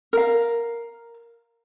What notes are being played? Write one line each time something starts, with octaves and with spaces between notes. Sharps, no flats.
A#4 F5